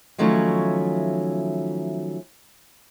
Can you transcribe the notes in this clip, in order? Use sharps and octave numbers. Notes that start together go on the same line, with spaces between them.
D#3 F3 F#3 A3 C#4 E4